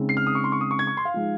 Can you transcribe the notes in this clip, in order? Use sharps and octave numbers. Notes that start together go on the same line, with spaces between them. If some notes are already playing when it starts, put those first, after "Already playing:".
Already playing: C#3 G#3 C4 D#4
C7
F6
D#6
C#6
C6
C#6
D#6
C#6
G#6
C#6
C6
F5
F3 G#3 D#4